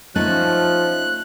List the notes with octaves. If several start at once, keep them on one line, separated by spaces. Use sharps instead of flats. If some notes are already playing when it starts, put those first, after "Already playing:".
F3 A3 C#4 D#4 F#6